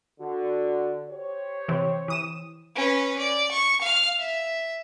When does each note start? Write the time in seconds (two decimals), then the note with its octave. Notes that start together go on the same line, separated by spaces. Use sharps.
0.20 D3 F#4
1.10 G4 C5 C#5
1.68 C3 E3 C4
2.08 E3 D#6 E7
2.75 C#4 B4
3.19 D5
3.52 C#6
3.81 F5 F6
4.20 E5